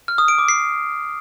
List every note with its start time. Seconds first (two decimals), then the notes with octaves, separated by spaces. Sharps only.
0.08 F6
0.18 D#6
0.28 D7
0.38 D6
0.49 C7